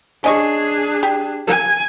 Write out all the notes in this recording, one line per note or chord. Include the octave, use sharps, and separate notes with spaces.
C#4 D4 G#4 D#5 C#6
G4
G#5